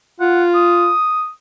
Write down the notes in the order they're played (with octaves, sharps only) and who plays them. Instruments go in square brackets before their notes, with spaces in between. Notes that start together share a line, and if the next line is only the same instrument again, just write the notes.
[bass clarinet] F4 [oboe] F#5
[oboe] D#6